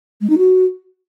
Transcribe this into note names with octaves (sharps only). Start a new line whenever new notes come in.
G#3
D#4
F#4